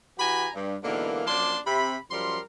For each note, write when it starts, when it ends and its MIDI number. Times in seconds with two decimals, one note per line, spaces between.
0.19 0.49 52
0.19 0.49 66
0.19 0.49 67
0.19 0.49 80
0.19 0.49 82
0.19 0.49 83
0.54 0.76 43
0.83 1.25 44
0.83 1.25 47
0.83 1.25 50
0.83 1.25 52
0.83 1.25 58
1.26 1.57 42
1.26 1.57 53
1.26 1.57 58
1.26 1.57 62
1.26 1.57 81
1.26 1.57 84
1.67 1.97 48
1.67 1.97 83
2.11 2.40 42
2.11 2.40 53
2.11 2.40 55
2.11 2.40 70
2.11 2.40 84